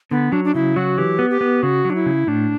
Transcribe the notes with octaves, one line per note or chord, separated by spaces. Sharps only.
D3 B3
F#3 D4
D4
C#3 E4
F#3 F#4
E3 G4
B3
G4
B3
C#3 F#4
F#3
D4
E4
C#3
A2 D4